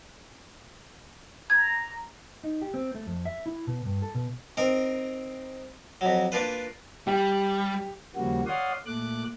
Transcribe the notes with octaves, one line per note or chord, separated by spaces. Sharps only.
A#5 G#6
D#4
G4
C4
A3
F2
E5
E4
B2
G2
A4
B2
C4 D#4 A#4
F2 F#3
A#3 D4 F4 B4
G3 G4
D#2 C#3 F3 G3 A#3 F#4
C#5 D5 F5 F#5 C6 D#6
A#2 A3 D6 F#6